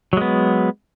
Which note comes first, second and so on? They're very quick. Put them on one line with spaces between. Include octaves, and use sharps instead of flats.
F#3 G#3 B3